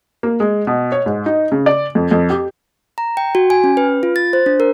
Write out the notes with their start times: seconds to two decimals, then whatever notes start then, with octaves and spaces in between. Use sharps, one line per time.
0.23 A#3
0.40 G#3
0.67 B2
0.92 C#5
1.06 G#2
1.26 D#4
1.52 C#3
1.66 D5
1.95 F2
2.11 F2
2.30 G4
2.98 A#5
3.17 G5
3.35 F#4
3.50 G#5
3.64 C#4
3.77 B4
4.03 F4
4.16 A6
4.33 C5
4.46 D4
4.60 A#4